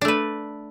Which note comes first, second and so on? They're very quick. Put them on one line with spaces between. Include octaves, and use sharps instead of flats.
D4 A3 B4